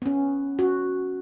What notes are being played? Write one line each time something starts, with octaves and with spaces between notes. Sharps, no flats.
B3 C#4
F#4